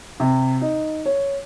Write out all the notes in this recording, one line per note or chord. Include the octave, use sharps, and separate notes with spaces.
C3
D#4
C#5